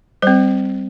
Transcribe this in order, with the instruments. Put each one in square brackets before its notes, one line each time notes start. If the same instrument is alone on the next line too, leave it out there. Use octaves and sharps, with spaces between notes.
[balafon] G3 C4 C5